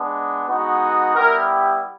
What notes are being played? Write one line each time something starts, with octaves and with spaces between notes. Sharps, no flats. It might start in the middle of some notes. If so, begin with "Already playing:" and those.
Already playing: G#3 B3 D4
G#3 B3 D#4 F#4
G3 B3 E4 G4 A#4